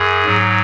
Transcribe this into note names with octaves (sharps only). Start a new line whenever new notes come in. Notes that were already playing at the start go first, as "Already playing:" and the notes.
Already playing: F#2 G#4
G#2 F#3